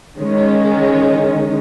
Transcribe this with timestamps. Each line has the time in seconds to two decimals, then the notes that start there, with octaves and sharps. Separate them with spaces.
0.18 D#3 G#3 C#4